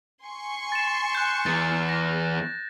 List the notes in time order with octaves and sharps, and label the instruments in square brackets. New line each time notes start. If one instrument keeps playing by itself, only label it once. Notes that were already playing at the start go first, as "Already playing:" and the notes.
[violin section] G#5 C6 C#6
[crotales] A6 E7
F#6 G6
[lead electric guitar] E2 [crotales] A6
[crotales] A#6